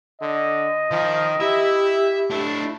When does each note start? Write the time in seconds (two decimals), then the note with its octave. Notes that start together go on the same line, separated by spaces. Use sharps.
0.21 D3 D#5
0.91 D#3 F3
1.40 E4 G4 E5
2.30 A3 D4 E4